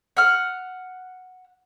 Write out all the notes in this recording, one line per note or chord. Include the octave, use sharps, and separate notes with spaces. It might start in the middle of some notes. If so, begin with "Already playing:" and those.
F#5 F6